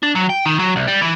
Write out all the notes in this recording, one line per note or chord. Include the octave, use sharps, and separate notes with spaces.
D4
F#3
G5
D#3
F#3
C2
G3
E3